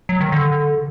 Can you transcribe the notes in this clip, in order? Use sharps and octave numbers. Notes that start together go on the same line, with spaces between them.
F#3
D#3
D3